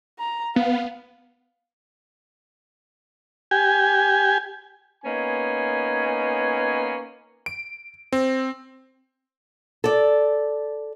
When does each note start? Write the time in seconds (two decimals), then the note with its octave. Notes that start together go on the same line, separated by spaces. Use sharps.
0.20 A#5
0.56 B3 F5
3.51 G4 G#5
5.05 A#3 B3 C#4 D#4 C#5 G#5
7.46 D7
8.13 C4
9.84 A4 D5